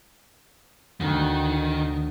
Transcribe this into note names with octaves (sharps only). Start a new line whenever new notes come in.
D2 D#3 D#4 F#6